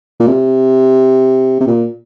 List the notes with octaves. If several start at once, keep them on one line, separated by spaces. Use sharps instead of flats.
A#2
C3
C3
A#2